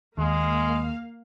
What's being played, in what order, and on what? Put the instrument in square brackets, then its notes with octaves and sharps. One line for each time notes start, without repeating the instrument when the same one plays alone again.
[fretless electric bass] D#2 [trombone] G#3 [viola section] A#3 F5